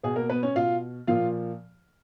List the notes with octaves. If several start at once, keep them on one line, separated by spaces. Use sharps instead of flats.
B2 G#4
A#3 A#4
B3 B4
C#4 C#5
B2 F4 F5
A#2 F3 F4 F5